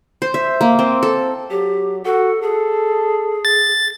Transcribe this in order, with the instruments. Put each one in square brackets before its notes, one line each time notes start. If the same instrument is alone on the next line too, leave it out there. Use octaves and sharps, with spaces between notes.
[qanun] C5
E5
A#3
C4
A4
[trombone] F#3 [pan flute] G4
[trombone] F#4 [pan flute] A4
[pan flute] G#4 [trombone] A4
[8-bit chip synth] A6